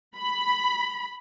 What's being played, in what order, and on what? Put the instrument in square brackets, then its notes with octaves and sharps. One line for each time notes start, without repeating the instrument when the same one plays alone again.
[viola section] B5